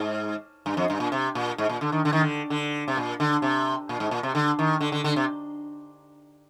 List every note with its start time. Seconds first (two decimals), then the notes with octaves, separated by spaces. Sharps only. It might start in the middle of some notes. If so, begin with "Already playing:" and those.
Already playing: G#2
0.66 G2
0.77 F2
0.90 G2
1.00 A#2
1.12 C3
1.35 A#2
1.58 G#2
1.69 A#2
1.81 D3
1.92 D#3
2.05 D3
2.13 D#3
2.21 D3
2.50 D3
2.88 C3
2.97 A#2
3.20 D3
3.42 C3
3.89 A#2
4.00 G#2
4.11 A#2
4.23 C3
4.35 D3
4.59 D#3
4.81 D3
4.92 D3
5.04 D3
5.16 C3